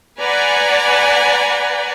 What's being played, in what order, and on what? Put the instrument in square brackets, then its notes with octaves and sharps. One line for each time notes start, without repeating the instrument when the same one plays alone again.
[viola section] B4 D5 F#5 G#5 A#5